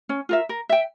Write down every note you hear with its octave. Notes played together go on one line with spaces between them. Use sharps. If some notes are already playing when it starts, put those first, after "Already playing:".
C#4
F4 A#4 E5
A#4
E5 G5